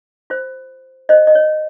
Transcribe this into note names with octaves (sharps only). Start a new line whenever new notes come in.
F4 C5
F4 C5 D#5
D#5
C#5